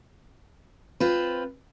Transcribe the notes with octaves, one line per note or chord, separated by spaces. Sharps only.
C4 F4 B4